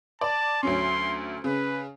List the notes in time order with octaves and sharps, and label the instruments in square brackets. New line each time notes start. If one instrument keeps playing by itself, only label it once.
[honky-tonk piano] D5 [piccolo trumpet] A5
[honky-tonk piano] D2 F#3 C#4 [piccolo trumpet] C6
[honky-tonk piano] C#3 [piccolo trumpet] B4